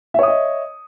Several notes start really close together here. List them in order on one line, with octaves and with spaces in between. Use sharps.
E5 C#5 D#6 D#5